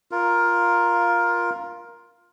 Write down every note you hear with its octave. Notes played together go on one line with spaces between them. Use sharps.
F4 A#4